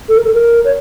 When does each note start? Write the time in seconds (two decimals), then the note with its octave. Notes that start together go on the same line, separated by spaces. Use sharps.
0.09 A4
0.17 A#4
0.24 A4
0.34 A#4
0.65 C#5